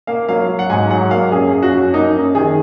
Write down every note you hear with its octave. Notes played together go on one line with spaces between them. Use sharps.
A#3 F5
F#3 F5
F#3
F#5
G#2 G#5
F#3 F#5
A#3 F5
F#2 G#4
F#2
F#4
F#2
A#3 D#4
F#2
D#3 G#4